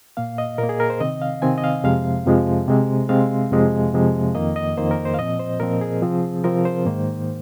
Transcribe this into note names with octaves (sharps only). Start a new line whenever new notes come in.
A#2 A#3 F5
D#5
A#2 A#3 A#4
G#4
A#4
C5
C3 D#3 C4 D#5
F5
C3 D#3 C4 G#5
D#5
F5
F2 C3 F3 G#3 F5
F2 C3 F3 G#3
C3 G#3 C4
C3 G#3 C4 F5
F2 C3 F3 G#3
F2 C3 F3 G#3
F2 D#3 A#3 D#5
D#5
F2 D#3 A#3 C5
A#4
C5
F5
A#2 F3 C4 D#5
C5
A#2 F3 C4 A#4
G#4
C3 F3 C4
C3 F3 C4 A#4
C5
G#2 D#3 A#3